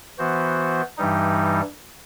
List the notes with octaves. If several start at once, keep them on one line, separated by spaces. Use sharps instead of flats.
E3 B3 F#4 C5
G2 E3 G3 D#4